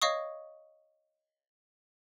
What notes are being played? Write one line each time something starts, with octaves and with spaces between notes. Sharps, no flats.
C#5 D#5 F5 C#6 D#6